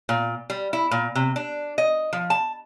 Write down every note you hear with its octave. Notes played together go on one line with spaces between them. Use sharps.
A#2
G3
E4
A#2
C3
D4
D#5
F3
A5